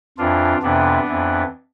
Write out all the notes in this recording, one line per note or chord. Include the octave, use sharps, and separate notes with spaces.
F2 E3 D4 F4
F2 C3 E3 B3 D4
F2 E3